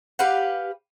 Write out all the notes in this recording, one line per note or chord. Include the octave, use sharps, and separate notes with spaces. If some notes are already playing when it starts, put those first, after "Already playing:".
G4 B4 F5 F#5